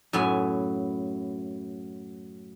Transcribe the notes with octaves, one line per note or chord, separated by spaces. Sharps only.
F#2 A2 B3 G#5